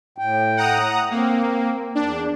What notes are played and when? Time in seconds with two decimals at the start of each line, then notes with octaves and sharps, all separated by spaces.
0.18 A2 G5
0.57 F#5 A#5 D#6
1.11 A#3 C4
1.95 E2 D4